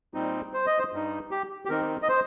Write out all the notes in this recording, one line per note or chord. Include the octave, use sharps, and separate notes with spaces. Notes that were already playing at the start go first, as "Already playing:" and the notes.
A#2 G3 C4 D#4
C5
D#5
C5
G2 G3 D#4
G4
G4
D#3 C4 D#4 A#4
D#5
C5